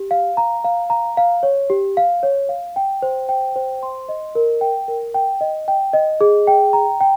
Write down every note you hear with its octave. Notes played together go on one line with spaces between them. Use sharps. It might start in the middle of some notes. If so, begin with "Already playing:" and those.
Already playing: G4
F5
A#5
F5
A#5
F5
C#5
G4
F5
C#5
F5
G5
C5
G5
C5
C6
D#5
A#4
G5
A#4
G5
D#5
G5
D#5
G#4
G5
A#5
G5